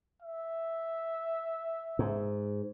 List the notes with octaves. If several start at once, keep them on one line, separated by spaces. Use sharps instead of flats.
E5
G#2